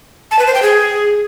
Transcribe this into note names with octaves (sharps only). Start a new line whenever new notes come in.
A5
B4
C5
G5
G#4